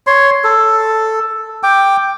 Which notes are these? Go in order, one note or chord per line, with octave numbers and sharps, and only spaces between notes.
C#5 C6
A4
G5 D6